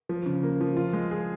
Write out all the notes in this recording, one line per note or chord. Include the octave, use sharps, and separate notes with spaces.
F3
C#3
A#3
F3
F4
G#3
G#4